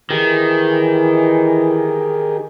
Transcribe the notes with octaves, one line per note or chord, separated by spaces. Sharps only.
D#3 E3 G4 G#4 A#4